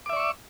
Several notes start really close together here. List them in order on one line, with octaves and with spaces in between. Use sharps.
D6 E5 D5 C#6 E6